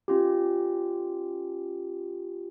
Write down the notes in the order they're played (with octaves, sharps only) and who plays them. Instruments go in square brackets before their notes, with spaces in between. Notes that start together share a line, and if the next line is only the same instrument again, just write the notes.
[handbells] C#4 F4 G4